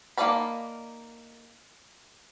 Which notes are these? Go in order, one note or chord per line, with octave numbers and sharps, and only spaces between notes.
A#3 D#4 D5 A5 B5